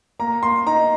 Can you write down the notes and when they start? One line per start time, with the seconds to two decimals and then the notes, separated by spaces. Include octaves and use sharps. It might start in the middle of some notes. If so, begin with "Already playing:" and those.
0.19 A#3 A#5
0.43 A#3 C6
0.67 D#4 A#5